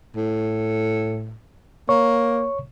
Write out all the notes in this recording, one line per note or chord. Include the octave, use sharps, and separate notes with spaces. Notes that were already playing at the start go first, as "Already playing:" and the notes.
A2
A#3 C#5 C#6